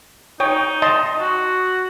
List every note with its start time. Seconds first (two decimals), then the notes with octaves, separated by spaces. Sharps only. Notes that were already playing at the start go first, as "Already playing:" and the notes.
0.40 D#4 C#5 G5
0.82 D#5 A5 C6
1.20 F#4